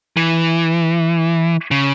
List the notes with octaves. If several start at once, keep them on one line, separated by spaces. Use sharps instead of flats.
E3
C#3